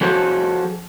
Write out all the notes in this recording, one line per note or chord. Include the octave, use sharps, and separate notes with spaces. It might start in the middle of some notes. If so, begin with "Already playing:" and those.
F3 F#4 G#4 A4 C5 C#5